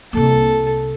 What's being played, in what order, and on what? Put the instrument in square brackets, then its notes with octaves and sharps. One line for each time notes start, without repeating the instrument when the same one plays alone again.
[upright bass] C2 A#3 [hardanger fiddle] A4